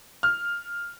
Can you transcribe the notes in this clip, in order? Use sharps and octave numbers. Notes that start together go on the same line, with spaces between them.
F6